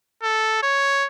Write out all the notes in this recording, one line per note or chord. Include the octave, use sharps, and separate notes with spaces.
A4
C#5